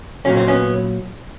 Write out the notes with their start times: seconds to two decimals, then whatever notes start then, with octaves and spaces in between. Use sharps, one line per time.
0.25 A#2 F#3 C#4
0.37 C4
0.48 B3 C#4